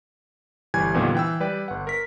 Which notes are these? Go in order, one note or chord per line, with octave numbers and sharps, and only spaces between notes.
G1 E3 G3 G#5 G#6
F2 A#2 D3 D#3 G3 B3
E3 G5 E6
G3 B4 D5 G5
G1 F#5
A#4 B6